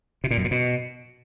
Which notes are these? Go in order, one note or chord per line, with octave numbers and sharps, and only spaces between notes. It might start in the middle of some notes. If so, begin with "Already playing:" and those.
C3
A#2
F#2
A#2
B2